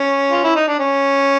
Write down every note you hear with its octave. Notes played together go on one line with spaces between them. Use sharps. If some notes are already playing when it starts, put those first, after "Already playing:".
Already playing: C#4
F4
E4
D#4
D4
C#4